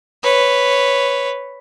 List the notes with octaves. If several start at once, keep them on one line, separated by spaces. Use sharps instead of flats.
B4 C#5